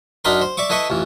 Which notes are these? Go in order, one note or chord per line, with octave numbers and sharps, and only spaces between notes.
F#2 D4 D#4 A#4 B5 C6
C5
D5 E5 C#6 D6
E4 A4 B4 D#5 E5 C#6
A1 F2 E3